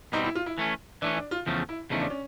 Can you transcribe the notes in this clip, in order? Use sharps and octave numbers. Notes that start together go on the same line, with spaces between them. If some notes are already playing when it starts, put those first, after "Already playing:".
B2 G3 C4 D#4
E4
F4
E4
E3 A3 C#4
E3 A3 C#4 D4
D4
F4
E2 C#3 F3 A3
E4
E2 C#3 F3 A3 D#4
D4
C#4